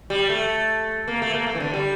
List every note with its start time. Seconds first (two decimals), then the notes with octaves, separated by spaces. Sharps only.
0.10 G3
0.30 A3
1.08 A#3
1.22 A3
1.34 A#3
1.47 A3
1.55 E3
1.60 D3
1.73 G3